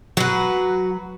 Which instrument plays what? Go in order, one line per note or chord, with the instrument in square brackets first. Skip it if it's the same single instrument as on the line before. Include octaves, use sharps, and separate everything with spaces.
[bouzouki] F#3 B4 [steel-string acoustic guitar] F#4